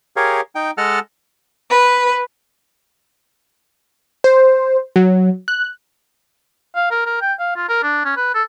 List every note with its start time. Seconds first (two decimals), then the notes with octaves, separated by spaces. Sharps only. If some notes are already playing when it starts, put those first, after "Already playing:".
0.16 G4 G#4 A#4 C#5 F5
0.55 D#4 G5
0.78 G#3 A4 D#5 F#5 A5 F6
1.71 B4
4.24 C5
4.96 F#3
5.48 F#6
6.75 F5
6.91 A#4
7.06 A#4
7.21 G5
7.39 F5
7.56 F4
7.69 A#4
7.83 D4
8.05 C#4
8.17 B4
8.35 A4